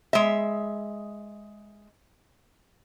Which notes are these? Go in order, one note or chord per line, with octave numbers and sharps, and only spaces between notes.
G#3 E5